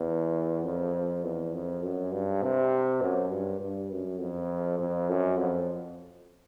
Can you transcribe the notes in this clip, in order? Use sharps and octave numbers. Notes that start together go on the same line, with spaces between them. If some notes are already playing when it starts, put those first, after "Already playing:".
Already playing: E2
F2
E2
F2
F#2
G2
C3
F#2
G2
G2
F#2
F2
F2
F#2
F2